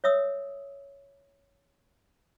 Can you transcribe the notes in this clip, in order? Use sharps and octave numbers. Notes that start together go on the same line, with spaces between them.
C#5 E5 D#6 E6